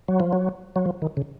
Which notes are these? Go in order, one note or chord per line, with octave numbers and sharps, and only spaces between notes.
F#3
F3
F#3
F#3
F3
D#3
C#3